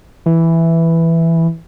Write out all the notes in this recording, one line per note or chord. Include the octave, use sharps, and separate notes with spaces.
E3